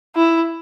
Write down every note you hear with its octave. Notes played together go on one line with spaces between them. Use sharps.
E4